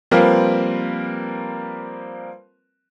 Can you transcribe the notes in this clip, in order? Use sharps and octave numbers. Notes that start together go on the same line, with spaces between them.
F3 G3 A#3 C4 A#4 B4